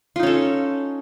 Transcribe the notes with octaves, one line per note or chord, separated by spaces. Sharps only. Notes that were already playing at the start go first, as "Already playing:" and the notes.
C#4 D#4 F4 A4